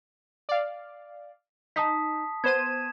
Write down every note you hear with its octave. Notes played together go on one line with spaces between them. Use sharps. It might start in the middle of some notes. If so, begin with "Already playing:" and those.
D5 F5
D#4 A5 D#6 B6
B3 C5 G#6 D#7 E7